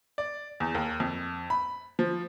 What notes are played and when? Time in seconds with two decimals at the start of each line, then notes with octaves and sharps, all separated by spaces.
0.18 D5
0.60 E2
0.75 D#2
1.00 F2
1.50 B5
1.99 F3